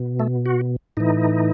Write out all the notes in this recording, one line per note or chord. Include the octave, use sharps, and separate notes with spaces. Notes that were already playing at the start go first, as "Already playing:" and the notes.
Already playing: B2
A3
F#4
A2 E3 D#4